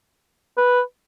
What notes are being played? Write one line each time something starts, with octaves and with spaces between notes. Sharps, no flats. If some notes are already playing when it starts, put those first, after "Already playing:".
B4